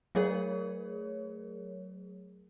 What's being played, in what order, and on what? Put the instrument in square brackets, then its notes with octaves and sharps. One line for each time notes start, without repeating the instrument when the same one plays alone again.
[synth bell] F#3 A3 G#4 A#4 C#5